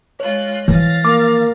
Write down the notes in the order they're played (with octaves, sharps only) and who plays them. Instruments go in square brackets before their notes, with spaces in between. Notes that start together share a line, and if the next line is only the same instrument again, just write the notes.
[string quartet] G#3 F4 F#6 [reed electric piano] C#5
[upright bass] E3 F3 [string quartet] F5 A6 A#6
[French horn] A#3 [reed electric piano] D6